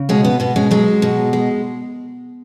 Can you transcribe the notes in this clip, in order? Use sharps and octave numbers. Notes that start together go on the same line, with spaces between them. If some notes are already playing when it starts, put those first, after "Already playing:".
Already playing: C#3
B2 G#3 C#4
B3
B2 B3
G#3 C#4
F#3 G#3
B2
G#3